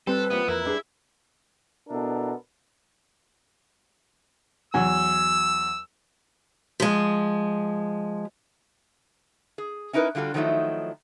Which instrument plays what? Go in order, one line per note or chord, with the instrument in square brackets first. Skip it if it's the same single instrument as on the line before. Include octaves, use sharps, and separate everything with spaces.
[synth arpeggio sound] G3 C4 [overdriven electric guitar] A4 [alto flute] B4 [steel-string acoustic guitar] A5
[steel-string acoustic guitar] E3 F3 A#3 [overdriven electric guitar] B3
[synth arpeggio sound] F2 A#4 [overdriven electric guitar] E4
[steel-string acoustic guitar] G3 D4 G#4
[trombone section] B2 B3 D4 E4 A4 A#4
[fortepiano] E2 F#3 G#5 [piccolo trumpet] E6
[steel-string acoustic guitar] F3 G#3
[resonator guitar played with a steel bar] G#4
C#4 D#4 E4 A#4 B4
D3 G3 F4 F#4 A4
D#3 F3 F#3 A3 D#4 E4